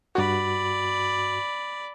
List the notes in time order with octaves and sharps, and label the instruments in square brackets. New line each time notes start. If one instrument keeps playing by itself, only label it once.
[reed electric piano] G2 F#4 [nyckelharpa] D5 B5